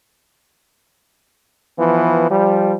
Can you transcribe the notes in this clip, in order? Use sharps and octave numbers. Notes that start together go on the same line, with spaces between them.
E3 F3 B3
F3 G3